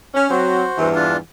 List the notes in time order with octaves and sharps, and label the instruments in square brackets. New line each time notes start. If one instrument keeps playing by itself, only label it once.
[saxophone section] C#4
[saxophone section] F#3 C4 [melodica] F#4 C5
[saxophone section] E2 G2 E3
[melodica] D4 F4